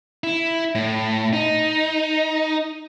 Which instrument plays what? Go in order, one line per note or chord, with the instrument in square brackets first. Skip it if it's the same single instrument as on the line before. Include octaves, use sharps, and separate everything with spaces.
[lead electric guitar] E4
A2
D#4